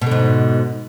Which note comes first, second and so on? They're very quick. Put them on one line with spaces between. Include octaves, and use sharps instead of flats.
B2 D3 G#2